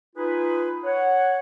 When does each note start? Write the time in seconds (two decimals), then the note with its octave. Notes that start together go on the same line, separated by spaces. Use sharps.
0.16 D#4 F4 G#4 B4
0.84 C#5 F#5